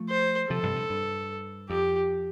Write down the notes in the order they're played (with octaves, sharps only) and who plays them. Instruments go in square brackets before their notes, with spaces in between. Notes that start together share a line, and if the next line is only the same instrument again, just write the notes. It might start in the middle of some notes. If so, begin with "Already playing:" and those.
Already playing: [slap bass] F3 A3
[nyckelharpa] C5
[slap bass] C3 F3 [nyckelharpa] A4
[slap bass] G2 C3
G2
G2
[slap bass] F2 [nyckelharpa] G4